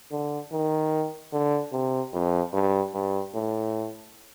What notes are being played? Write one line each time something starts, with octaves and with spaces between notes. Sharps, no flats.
D3
D#3
D3
C3
F2
G2
G2
A2